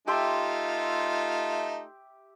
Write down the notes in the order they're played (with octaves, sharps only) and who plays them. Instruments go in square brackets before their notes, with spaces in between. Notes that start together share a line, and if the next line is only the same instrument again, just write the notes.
[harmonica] A3 D#4 F4 [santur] G4 E5 C6